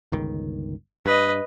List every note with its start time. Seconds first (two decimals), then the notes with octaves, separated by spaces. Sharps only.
0.12 G1 C#2 D#3
1.06 G2 B4 D#5